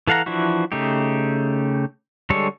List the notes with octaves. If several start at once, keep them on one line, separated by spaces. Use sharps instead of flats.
E3 A4 F5 F#5 A#5
E3 F3 D4 E4 F#4
C#3 A3 D#4 G4
D3 G3 G#3 A4 C#5